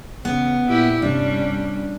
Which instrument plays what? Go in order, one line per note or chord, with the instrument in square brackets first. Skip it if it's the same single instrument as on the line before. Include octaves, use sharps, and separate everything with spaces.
[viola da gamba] C#3 [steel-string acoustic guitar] B3
[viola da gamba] A#2 E4 G4
[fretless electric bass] G2 C3 [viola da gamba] G3 C#4 [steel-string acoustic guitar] D4